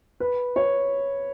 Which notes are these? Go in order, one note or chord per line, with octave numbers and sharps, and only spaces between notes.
B4
C#5